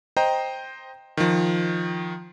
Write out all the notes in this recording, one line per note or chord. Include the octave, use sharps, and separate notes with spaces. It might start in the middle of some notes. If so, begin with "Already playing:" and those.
C5 D#5 G5 A#5
D#3 F3